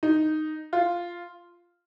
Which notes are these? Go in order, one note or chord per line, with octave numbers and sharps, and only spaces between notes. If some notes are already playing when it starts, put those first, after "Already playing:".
D#4
F4